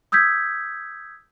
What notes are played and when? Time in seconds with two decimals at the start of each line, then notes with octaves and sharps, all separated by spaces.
0.12 D#6 E6 G6 G#6 B6